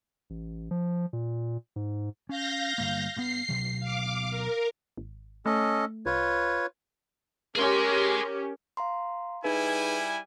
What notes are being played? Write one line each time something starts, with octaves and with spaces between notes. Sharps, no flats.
A1
F3
A#2
G#2
C#4 F5 G6 A#6
G1 G2 A#3
G2 B3 C7
D2 B2 F#3
F5 D6
A#4
G#1
A3 C#4 A4 D#5
C2 F4 B4 C#5
C#4 G4 G#4 A#4 C6
F5 A#5 C6
G3 D#4 E4 G#4 B4 G#5